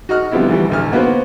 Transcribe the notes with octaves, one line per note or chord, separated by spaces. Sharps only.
F#4 D#5 F6 F#6
D3 F3 G3 B3 C4 E4
D2 E3 G3
A1 D2 F6
A#3 B3 F#4 B4 C5